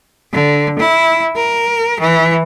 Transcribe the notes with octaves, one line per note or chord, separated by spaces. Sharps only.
D3
E4
A#4
E3